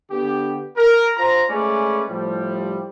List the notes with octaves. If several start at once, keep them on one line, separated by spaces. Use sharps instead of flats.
D3 B3 G4
A#4
F4 C5 A#5
G#3 A3 C#4 B4 D5
A2 F3 G3